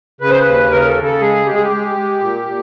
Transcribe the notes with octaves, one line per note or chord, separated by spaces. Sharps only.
C#3 B4
C5
B4
D#2
C#3 A#4
A4
C#3
A4
G#3 G#4
G#3 G4
G#4
G4
G#3
G#3
A#2
A#2